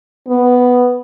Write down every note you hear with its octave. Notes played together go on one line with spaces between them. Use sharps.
B3